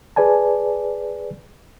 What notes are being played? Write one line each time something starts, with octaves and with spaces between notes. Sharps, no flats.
G#4 B4 D5 G#5 A5